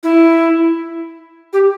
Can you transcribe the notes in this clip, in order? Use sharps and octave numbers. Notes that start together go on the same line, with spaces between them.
E4
G4